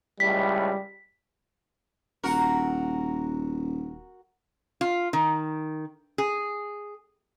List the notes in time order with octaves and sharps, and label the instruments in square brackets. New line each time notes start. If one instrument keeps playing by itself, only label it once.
[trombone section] C#2 A2 [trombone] G3 [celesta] B6
[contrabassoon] D#1 [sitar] F#4 A#4
[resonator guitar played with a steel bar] F4
D#3
G#4